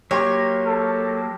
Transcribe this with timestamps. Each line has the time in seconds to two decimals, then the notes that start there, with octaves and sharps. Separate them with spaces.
0.11 F#3 A#3 G4 C#5 C6
0.66 A4